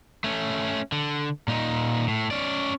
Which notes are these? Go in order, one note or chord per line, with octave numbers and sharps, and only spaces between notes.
A3 C#4
D3
A#2 D#4
A2
C#4 D5